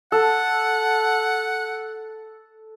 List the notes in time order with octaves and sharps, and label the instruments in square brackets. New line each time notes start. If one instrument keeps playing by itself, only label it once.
[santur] A4 [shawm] F#5